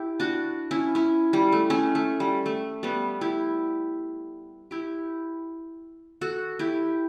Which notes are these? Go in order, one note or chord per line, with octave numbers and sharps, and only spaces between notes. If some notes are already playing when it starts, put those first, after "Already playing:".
Already playing: E4 G4
D4 F#4
C#4 E4
C#4 E4
G3
A3
A3 C#4
A3
G3
A3
G3 B3
E4 G4
E4 G4
F#4 A4
E4 G4